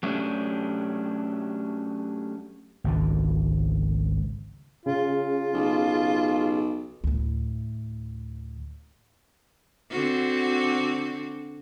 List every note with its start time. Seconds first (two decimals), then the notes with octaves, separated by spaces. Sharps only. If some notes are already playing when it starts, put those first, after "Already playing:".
0.03 F#3 A3 C#4 D4 G4
2.84 G#1 C#2 D3
4.86 C#3 F4
5.54 B1
7.04 D2 A2
9.91 D3 C4 F#4